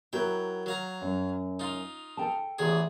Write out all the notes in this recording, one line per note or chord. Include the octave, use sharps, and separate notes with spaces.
F#3 E4 F#4 A#4 G5
F#3 F5 A#5
F#2
D#4 F4
A4 G5 A5
A1 E2 G#4